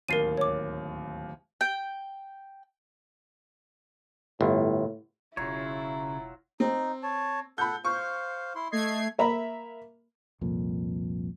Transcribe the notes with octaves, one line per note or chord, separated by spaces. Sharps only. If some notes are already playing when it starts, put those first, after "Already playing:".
D1 D#2 A#4 A6 C7 D#7
C#5 D6
G5
G1 A2
E1 C#3 F#3 E4 F4 C#5
C4 D#4
C#5 A5
A4 F#5 B5 G6
C5 F5 C#6
E4 C6
A3 D#5 G#6 C7
A#3 E5 A#5 B5
C2 F2 A#2